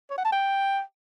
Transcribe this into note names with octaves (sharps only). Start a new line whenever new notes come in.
C#5
F#5
A5
G5